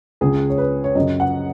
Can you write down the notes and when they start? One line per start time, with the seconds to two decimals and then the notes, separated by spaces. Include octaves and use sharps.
0.21 C#2 C#3 G#4
0.50 C#5
0.58 B4
0.84 C#5
0.95 F#2 C#3 D#5
1.20 F#5